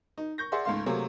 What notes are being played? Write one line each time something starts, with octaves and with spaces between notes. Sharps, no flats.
D#4
C#6 G6 A#6
G#4 D5 E5 F#5 C6
C#2 G#2 A3 F5 C6
C3 F#3 A3 A#3 G#4